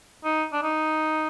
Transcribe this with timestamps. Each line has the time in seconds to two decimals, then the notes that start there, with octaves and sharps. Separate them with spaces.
0.24 D#4
0.53 D4
0.63 D#4